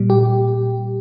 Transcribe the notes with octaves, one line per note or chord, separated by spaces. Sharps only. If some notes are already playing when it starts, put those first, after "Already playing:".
Already playing: A#2 G3
G4